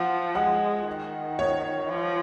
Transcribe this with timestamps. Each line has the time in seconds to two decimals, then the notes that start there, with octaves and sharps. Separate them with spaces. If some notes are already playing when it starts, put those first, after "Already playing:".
Already playing: F3 F#5
0.35 G#3 F#5
0.87 D#3
1.39 C#5
1.89 F3